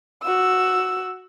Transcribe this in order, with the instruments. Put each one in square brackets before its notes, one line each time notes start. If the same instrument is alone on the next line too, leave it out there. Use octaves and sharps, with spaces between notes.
[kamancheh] F#4 E6